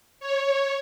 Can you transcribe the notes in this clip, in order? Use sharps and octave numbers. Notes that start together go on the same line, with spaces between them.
C#5